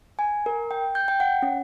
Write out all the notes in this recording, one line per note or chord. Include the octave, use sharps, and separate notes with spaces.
G#5
A#4
G5
G6
G5
F#5
C#4